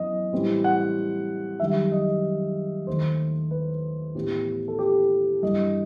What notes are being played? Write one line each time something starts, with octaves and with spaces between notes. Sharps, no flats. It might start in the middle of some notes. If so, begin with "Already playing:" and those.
Already playing: F#2 E3 B3 D#5
A2 E3 G3 C4
F#5
F#2 D#3 G3 E5
D#5
D#2 D#3 A3 C5
B4
A2 E3 B3 G4
A4
G4
G2 E3 G3 D#5